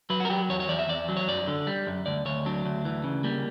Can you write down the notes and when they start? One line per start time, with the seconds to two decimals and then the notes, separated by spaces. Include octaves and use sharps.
0.10 F#3 B4
0.20 F#4 A#4
0.30 F#3 G4
0.49 E2 C#5
0.60 C#5
0.69 E2 D5
0.79 E5
0.89 E2 D5
1.09 F#3
1.17 C#5
1.28 F#2 D5
1.48 D3
1.67 G3
1.87 F#2
2.06 D2 D5
2.26 D2 C#5
2.46 F#3 D4
2.65 D2
2.85 E3
3.04 C#3
3.24 G3 A#3